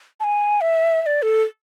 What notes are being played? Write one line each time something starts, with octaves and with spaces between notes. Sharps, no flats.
A5
G#5
E5
E5
D5
A4